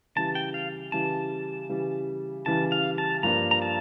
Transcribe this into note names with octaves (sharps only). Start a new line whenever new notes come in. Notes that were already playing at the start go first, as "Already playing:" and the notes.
C#3 E3 G3 A5
G5
F5
C#3 E3 G3 A5
C#3 E3 G3
C#3 E3 G3 A5
F5
A5
G2 F3 A#3 D4 A#5
A#5
A5